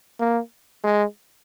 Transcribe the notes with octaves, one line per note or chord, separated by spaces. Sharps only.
A#3
G#3